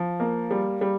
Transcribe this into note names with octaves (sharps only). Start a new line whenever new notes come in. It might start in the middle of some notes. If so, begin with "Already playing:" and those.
Already playing: F3
A#3
G3
G3